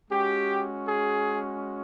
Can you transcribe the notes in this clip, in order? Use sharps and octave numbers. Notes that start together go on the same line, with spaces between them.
G#3 C#4 F#4 G4
G#4